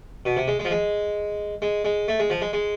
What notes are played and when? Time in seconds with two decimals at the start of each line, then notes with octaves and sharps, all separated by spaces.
0.26 B2
0.37 C3
0.48 G#3
0.59 G#3
0.65 F3
0.71 G#3
1.62 G#3
1.85 G#3
2.08 A3
2.20 G#3
2.30 F3
2.42 G#3
2.53 G#3